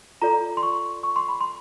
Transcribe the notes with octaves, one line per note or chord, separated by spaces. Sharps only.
F4 A4 D5 A#5
C6
C#6
C#6
C6
B5
C6